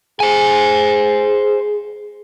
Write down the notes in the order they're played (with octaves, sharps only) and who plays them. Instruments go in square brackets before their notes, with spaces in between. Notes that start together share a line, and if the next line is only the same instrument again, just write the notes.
[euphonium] G#4 [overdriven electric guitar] C5 G#5